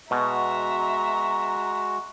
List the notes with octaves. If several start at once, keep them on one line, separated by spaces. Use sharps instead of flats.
B2 G#3 F#4 E5 A#5